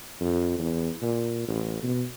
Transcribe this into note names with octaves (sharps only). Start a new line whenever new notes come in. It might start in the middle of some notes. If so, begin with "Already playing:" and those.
F2
E2
A#2
A1
B2